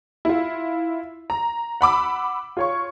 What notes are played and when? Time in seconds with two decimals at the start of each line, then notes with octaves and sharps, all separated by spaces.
0.25 E4 F4
1.30 A#5
1.81 F#5 B5 D6 E6
2.57 F4 C#5 C#6